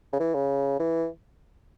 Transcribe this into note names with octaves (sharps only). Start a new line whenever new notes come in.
C#3
E3
C#3
E3